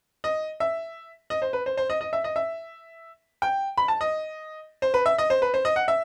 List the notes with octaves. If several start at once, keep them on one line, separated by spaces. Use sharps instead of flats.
D#5
E5
D#5
C5
B4
C5
C5
D#5
D#5
E5
D#5
E5
G5
B5
A5
D#5
C5
B4
E5
D#5
C5
B4
C5
D#5
F#5
E5